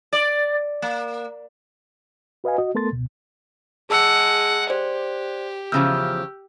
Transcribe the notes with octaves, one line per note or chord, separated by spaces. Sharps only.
D5
A#3
F#4 B4 D#5 F5 G#5
F#4 D#5
A3 B3 A4 A#4 C6 A6
C#2 B2
G#3 G#4 F#5 A5 E6
G4 C5 D5
E2 C#3 F3 E6 F6 G6